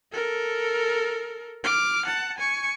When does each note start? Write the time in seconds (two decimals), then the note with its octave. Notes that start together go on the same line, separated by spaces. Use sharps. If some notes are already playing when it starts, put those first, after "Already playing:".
0.12 A4 A#4
1.64 D6 F6
2.05 F#5 A5
2.38 G#5 C#6